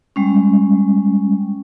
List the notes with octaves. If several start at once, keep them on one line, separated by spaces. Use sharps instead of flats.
G3 G#3 C#4